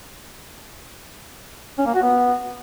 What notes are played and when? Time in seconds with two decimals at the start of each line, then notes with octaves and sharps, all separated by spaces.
1.78 C#4
1.86 A#3
1.94 F#4
2.03 B3